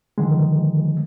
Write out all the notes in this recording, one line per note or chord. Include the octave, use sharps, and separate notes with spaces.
D3 D#3 F3 G#3